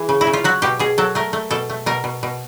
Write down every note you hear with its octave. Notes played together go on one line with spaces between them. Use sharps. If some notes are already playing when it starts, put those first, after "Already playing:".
Already playing: E3 G#4
C#3
E4
C#3
F4
F#3 F#4
B2 G4
B2 G#4
F#3 A4
A3 A#4
A3
B2 A4
A3
B2 A#4
B2
B2